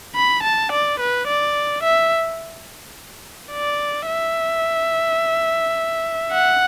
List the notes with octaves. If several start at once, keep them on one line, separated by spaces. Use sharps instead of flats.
B5
A5
D5
B4
D5
E5
D5
E5
F#5